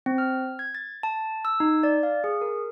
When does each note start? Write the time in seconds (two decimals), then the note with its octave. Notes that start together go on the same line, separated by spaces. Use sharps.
0.06 C4
0.18 F6
0.59 G#6
0.75 A6
1.03 A5
1.45 E6
1.60 D#4
1.83 D5
2.03 F5
2.24 G#4
2.41 A#4